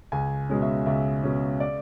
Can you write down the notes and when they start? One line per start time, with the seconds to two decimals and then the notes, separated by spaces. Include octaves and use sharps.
0.12 C#2 G#5
0.49 B2 G#3 C#4
0.62 E5
0.86 C#2 E5
1.24 B2 G#3 C#4
1.60 D5